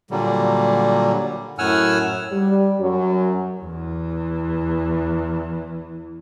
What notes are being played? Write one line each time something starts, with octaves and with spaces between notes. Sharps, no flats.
A#2 D3 F#3 G3
F#2 A2 F#5 G#5 E6 F6
G3
F#2 F#3
E2 E3